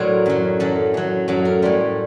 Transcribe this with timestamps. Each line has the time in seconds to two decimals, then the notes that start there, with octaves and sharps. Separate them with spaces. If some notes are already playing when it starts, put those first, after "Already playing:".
Already playing: A2 F#3 D4 A#4 C5
0.26 F#2 F#3
0.60 F#2 F#3 A4
0.94 F#2 F#3
1.28 F#2 F#3 A4
1.45 A#4
1.62 A2 G3 C5